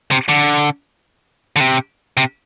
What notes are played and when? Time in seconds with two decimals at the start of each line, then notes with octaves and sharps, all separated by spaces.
0.11 C3
0.29 D3
1.56 D3
1.60 C3
2.17 C3